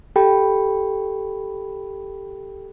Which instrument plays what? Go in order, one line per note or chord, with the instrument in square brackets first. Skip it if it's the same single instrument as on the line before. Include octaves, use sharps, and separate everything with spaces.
[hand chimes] G4 A4 G5 B5